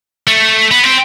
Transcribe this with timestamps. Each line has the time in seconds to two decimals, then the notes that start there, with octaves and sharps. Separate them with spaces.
0.27 A3
0.71 B3
0.83 C4